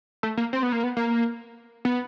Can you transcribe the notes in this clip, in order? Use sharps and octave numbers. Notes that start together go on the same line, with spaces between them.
A3
A#3
C4
B3
A#3
B3
A#3
B3